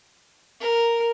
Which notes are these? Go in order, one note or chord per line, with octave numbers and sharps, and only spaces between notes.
A#4